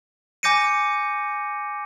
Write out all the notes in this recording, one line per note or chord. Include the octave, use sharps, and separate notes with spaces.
G#5 D6 G6 A#6 C#7 D#7